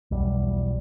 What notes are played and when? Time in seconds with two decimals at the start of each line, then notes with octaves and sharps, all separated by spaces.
0.11 B1 E2 G3